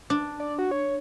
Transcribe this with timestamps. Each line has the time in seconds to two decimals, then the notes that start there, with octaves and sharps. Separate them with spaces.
0.10 D4
0.40 D5
0.59 F#4
0.71 C#5